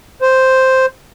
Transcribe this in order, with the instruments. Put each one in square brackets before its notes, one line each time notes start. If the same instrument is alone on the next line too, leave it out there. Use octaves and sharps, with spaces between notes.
[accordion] C5